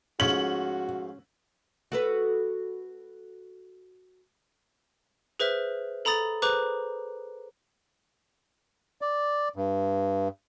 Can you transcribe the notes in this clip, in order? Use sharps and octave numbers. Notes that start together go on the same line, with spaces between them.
G#2 F3 A3 C#4 F#4 F#7
F#4 A4 B4
G#4 B4 C5 E5 F6
A4 A#5 B5 D#6 A6
G#4 B4 C5 A#5 D6 F#6
D5
G2